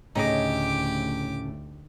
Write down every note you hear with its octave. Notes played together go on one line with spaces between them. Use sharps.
D2 A2 C#3 A3 D#4 G4 D#5 D6